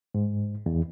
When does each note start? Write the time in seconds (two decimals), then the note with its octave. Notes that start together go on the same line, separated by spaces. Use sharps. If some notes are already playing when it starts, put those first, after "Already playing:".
0.15 G#2
0.66 E2